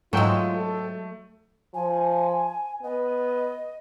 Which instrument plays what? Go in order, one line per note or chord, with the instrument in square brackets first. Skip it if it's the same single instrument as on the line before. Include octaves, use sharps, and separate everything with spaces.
[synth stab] G#2 G5 E6 [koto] F#3 G#3 [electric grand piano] A3 [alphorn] F4
[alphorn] A4
[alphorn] F3 [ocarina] G#5
[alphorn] B3 [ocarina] D#5